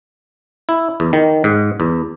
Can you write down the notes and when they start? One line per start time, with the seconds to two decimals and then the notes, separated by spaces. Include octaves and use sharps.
0.69 E4
1.00 E2
1.13 D#3
1.44 G#2
1.80 E2